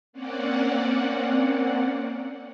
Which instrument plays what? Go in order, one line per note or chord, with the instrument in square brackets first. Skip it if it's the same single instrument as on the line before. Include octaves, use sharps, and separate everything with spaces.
[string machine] A#3 C4 C#4 D5 F#5